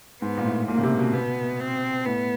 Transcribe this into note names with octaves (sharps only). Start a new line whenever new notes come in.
G#2 B3
A#2
A2
A#2 A#3
C#3
C3
B2
B3
C4
A2 B3